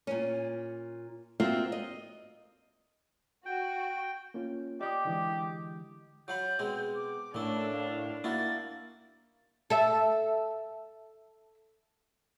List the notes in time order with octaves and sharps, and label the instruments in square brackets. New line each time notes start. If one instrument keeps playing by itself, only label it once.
[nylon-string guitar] A#2 C#4
A#3 C4 F4 F#4 E5
D#5
[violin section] F#4 [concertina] G5
[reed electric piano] A#3 C#4 F4
[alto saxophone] G4 [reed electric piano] D5 [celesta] D#5 D6 D#6
[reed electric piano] D3 E3 G#3
[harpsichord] F#3 F5 B5 [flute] G6
[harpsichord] B2 G#3 C4
[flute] D6
[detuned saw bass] A2 [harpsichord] A#3 C#4 [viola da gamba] D4 [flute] E6
[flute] F5
[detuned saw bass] A#3 [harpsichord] D#4 E4 F#4 [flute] A6
[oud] A4 E5